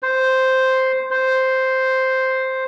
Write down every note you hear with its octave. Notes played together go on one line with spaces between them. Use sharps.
C5
C5